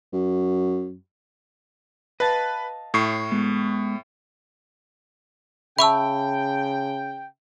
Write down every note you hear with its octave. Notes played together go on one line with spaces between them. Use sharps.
F#2
B4 D#5 F5 A5
A2 C#6 C7
G#3 B3
C#3 E5 G5 A5 B5 C#6 E6